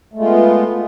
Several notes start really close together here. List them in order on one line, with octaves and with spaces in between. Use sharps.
A3 G#3 F4 B3